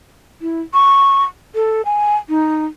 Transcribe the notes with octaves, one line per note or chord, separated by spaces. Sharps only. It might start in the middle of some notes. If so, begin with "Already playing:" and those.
E4
C#6
A4
G#5
D#4